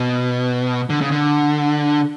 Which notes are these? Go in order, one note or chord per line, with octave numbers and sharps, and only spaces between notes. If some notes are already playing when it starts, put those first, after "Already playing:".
Already playing: B2
D3
C#3
D3